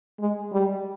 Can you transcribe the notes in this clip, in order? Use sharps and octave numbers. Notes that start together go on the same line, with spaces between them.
G#3
G3